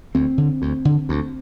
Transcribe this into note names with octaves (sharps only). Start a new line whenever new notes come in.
D2 C4
D3
D2
D3
D2